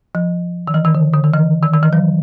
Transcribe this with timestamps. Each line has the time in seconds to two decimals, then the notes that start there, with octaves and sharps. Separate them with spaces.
0.15 F3
0.68 D#3
0.74 E3
0.85 D#3
0.95 D3
1.13 D3
1.24 D#3
1.33 E3
1.63 D#3
1.74 D#3
1.83 E3
1.93 F#3